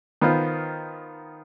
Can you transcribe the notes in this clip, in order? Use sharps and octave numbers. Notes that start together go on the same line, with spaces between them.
D#3 B3 F4 C5